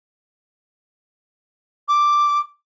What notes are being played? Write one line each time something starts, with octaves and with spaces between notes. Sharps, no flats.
D6